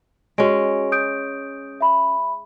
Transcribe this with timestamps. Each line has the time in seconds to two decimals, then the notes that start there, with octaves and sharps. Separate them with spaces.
0.38 G#3 C#4 F#4 D7
0.92 D#6 G6 D7
1.81 E5 B5